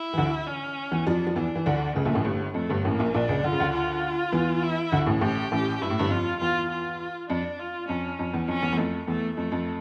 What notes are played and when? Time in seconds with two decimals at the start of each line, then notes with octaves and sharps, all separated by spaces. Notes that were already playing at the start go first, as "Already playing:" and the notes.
Already playing: E4
0.13 E3
0.17 D2 D3
0.47 C#4
0.91 E2 E3
1.06 F2 F3 D4
1.27 F3
1.36 E2 E3 D4
1.55 E3
1.66 D2 D3
1.95 C#2 C#3 A3
2.05 A#1 A#2
2.15 A1 A2
2.25 G1 G2
2.54 F2 A3
2.70 G1 G2
2.84 A1 A2 A#3
2.99 A#1 A#2
3.14 A#1 A#2 D4
3.29 C#2 C#3
3.44 D3 F4
3.52 C#3
3.60 D2 D3
3.74 F4
4.32 E2 E3
4.62 E4
4.92 D2 D3
5.06 A1 A2
5.21 A1 A2 G4
5.52 A1 A2
5.82 G2 E4
5.90 A2
5.99 G1 G2
6.10 F2 F4
6.40 E2 F4
6.71 F4
7.29 F2 D4
7.59 F4
7.88 F2 C#4
8.19 F2
8.34 E2
8.48 F2 C#4
8.62 E2
8.72 E2
8.77 F2 A3
9.07 E2 A3
9.37 F2 A3
9.52 F2